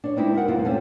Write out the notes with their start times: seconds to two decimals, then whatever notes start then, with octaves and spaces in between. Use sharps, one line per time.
0.04 D4 C#5
0.17 G#3 A#3 C4 D#4 E4
0.35 F#4 A#4 F#5
0.48 F2 C3 G#3 A#3 E4 F4
0.65 A3 C4 C#4 A4